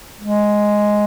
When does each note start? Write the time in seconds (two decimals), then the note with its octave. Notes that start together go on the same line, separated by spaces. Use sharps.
0.21 G#3